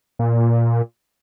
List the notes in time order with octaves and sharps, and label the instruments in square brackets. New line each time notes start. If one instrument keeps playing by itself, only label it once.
[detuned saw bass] A#2